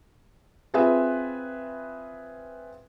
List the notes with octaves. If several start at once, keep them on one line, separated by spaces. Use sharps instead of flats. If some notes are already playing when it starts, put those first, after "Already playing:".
C4 F4 G#4 B4 E5